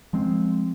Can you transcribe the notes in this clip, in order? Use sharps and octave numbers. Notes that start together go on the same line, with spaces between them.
F3 G#3 C4